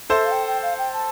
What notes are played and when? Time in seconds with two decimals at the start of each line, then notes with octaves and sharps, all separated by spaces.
0.10 A4 C5 E5
0.25 F5
0.31 G5
0.47 G5
0.63 F5
0.78 G5
0.93 A5